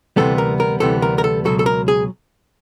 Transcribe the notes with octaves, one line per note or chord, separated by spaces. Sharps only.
D2 C3 E3 G3 B3 A4
A#4
A#4
D2 C3 E3 G3 B3 A4
A#4
A#4
A4
C#2 B2 F#3 A4
A4
A#4
G#4